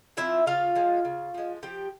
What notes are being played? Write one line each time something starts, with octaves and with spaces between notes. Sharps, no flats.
F3 C4 E4 F4 E5
C#3 F4 F5
F3 G#3
C#3
F3 G#3
F3 G4 G5